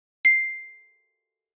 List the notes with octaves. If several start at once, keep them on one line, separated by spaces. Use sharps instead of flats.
C7